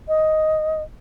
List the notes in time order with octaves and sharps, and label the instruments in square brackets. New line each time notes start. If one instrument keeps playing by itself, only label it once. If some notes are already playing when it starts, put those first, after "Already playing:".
[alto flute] D#5